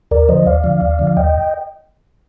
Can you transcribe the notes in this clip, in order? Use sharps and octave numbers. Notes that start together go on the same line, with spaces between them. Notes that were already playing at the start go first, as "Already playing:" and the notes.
D#2 A#4 D5
D3 F3 C5 D#5
D#2 D5 F5
D3 F3
D#2
D3 F3
F5
D#2 D#5 G5